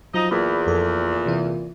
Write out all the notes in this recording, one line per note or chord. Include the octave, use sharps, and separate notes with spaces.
F3 F#3 D#4 D#5
E2 A#2 B5
F2 A4
C3 E3 E4